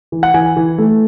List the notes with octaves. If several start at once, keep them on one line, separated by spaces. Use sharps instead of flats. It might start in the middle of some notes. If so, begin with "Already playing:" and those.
E3
F#5
E3 G#5
E3
A3